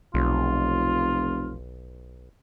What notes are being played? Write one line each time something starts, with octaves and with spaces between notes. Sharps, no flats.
F1 B1 F4